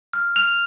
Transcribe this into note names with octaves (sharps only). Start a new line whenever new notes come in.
F6
F6 F7